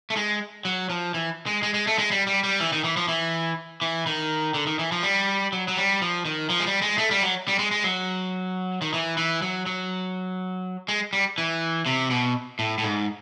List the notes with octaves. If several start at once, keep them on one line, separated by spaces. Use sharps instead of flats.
A3
G#3
F#3
F3
E3
G#3
G#3
G#3
A3
G#3
G3
G3
G3
E3
D#3
E3
F3
E3
E3
D#3
D3
D#3
E3
F3
G3
F#3
F#3
G3
F3
D#3
F3
G#3
G3
G#3
A3
G3
F#3
G3
G#3
G#3
F#3
D#3
E3
E3
F#3
F#3
G#3
G3
E3
C3
B2
A2
A2
G#2